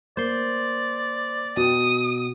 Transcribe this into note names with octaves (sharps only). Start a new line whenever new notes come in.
A#3 C5 D5 C6
B2 F#4 G5 D#6